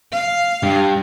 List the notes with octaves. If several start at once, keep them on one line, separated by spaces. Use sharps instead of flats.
F5
G2